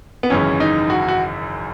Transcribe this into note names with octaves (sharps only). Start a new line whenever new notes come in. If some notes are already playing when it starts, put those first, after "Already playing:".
B3
G#1 F#2 C#3 E3 C#4
D#4
F#4
F#4